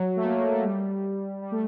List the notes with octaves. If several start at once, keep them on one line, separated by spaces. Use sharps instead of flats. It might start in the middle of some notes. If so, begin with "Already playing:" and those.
Already playing: F#3
A3
A#3
A#3
A3
G3
G3
A3